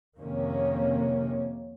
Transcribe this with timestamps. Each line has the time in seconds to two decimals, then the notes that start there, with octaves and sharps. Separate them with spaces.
0.18 F2 C3 D#3 A#3 C#4